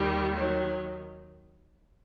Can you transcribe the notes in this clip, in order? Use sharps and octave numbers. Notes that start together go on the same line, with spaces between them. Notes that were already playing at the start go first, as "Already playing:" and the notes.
Already playing: D#2 D#3 G3
F#3